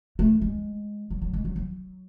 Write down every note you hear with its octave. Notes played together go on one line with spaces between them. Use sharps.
A3
G#3
F#3
F#3
G#3
F#3
F#3